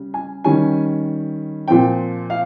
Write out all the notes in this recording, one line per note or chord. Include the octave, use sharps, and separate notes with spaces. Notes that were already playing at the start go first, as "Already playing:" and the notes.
Already playing: C#3 G3
G#5
D#3 G3 C#4 G#5
A#2 F3 C4 G5
F5